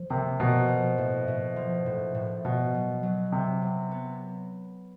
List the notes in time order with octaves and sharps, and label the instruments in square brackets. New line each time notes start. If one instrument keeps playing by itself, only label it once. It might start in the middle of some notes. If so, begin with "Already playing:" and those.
Already playing: [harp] F3
[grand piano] C3 [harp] A#3
[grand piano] B2 [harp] F3
[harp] F3
A2
A2
F3
A2
A2
[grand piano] B2 [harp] B3
[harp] F#3
F#3
[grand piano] C3 [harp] B3
[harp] F#3
B3